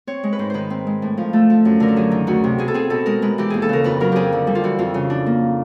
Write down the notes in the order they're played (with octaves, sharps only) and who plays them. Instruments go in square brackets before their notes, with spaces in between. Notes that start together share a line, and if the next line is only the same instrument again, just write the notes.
[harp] C4 C#5
G#3
B4
G#2 C5
D#3 B4 C5
C4
G#3
A2
F3
A3 A4
F3
F#2
D3 A#4
A4
F#3 G#4
D#3
D2 F#4
C3
B2 G#4
A4
C4 G#4
B2 A4
G#3 A#4
G#3 B4
E3 G4
D#2 G#4
A4
C#3 A#4
F2 B4
F#3 A#4
F2 G4 G#4
D3
G3
F4
E3 F#4
F2 F4
C#3
D4
A#3